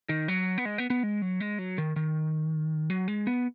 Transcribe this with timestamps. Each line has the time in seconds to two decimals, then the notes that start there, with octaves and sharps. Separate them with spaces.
0.09 D#3
0.28 F#3
0.58 B3
0.65 G#3
0.78 B3
0.90 B3
1.03 G#3
1.22 F#3
1.40 G#3
1.58 F#3
1.78 D#3
1.96 D#3
2.90 F#3
3.08 G#3
3.27 B3